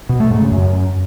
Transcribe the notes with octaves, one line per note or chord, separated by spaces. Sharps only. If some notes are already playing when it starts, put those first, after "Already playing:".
B2
A3
G#2
C#3
F#2